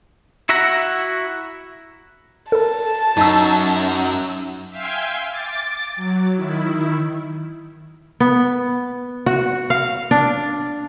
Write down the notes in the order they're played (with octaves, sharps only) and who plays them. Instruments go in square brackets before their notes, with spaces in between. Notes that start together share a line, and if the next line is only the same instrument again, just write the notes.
[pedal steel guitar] E4 F#4 E5 F#5 A#5
[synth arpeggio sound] A4 A#4 [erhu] A5
[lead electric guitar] F#2 [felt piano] D#4 E6
[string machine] E5 F5 G5 G#5 C6
D6 A6
F#3
D#3 E4
[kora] B3
F#4
F5
D4